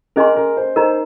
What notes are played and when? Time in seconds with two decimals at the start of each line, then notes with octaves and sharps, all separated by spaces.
0.16 C#4 G#4 A#4 D#5 G#5 C6
0.36 A#4
0.57 C5
0.76 D#4 A#4 C5 D#5 A#5